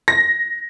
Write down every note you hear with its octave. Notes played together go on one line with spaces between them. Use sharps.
A#6